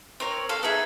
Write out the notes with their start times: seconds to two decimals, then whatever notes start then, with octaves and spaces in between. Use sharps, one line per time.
0.20 C4 A#4 C#5
0.49 A4 F5
0.63 B3 D#4 G#4 E5